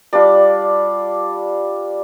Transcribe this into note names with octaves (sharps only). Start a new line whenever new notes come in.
G3 D4 F4 D5